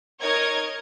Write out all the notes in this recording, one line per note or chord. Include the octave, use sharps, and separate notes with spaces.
D#4 A#4 C#5 D#5 G#6